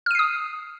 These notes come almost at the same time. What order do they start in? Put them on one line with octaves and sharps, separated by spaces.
F6 D#7 C7 D#6